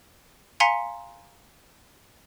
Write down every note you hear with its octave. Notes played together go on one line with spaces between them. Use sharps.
F5 G#5 A#5 C6 B6 C#7